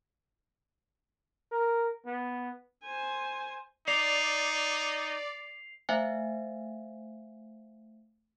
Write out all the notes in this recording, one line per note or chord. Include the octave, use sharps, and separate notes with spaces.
A#4
B3
C5 G#5
D#4 D5 C7 F7
A3 C5 E5 F5 G#5